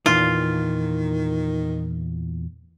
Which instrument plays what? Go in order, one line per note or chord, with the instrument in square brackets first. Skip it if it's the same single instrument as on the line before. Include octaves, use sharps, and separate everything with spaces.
[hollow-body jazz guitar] E2 A#2 E3 [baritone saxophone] D#3 [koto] F4